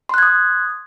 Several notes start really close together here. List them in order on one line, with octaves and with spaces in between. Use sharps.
C6 F#6 G#6 D#6